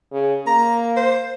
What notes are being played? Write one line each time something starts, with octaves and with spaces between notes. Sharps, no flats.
C#3
A#3 A#5
C5